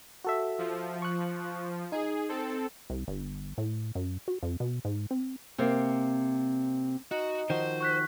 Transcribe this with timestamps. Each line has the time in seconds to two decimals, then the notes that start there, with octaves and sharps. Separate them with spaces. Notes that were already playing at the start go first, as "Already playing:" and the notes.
0.24 F#4 A4 E5
0.58 F3
1.02 C#6 F#6
1.92 D#4 G#4
2.29 C4 A4
2.90 C2
3.08 G1
3.58 A2
3.95 F#2
4.28 F#4
4.43 F2
4.60 B2
4.85 G#2
5.11 C4
5.58 C3 A#3 C4
7.11 D#4 F#4
7.50 D#3 F3 F#4 C5
7.81 C#6 F#6 B6